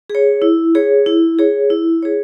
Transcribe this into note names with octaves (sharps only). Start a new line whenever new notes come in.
G#4
C#5
E4
G#4 C#5
E4
G#4 C#5
E4
G#4 C#5